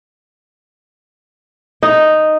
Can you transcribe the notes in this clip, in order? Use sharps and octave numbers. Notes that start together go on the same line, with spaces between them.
D#4